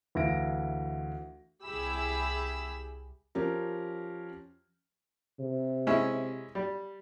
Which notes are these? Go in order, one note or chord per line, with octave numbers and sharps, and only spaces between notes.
D2 E3 E5 F5 A#6 D7
C2 E4 G4 G#4 B5 E6
F3 C#4 G4 A#4
C3
G#3 C#4 E4
G3